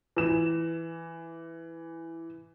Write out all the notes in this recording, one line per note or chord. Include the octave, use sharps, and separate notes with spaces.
E3 E7